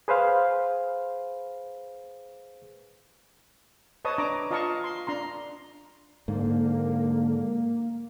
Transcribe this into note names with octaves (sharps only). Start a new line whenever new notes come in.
G#4 B4 C5 F5
B4 C#5 D#5 A5 D#6
D4 A#5 D6
F4 D#5 F5 A5 A#5 C#6
C6
D4 A#5 C6
G#2 D3 A#3